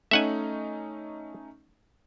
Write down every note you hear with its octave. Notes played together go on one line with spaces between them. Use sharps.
A3 C#4 D#4 E5 F#5 G#5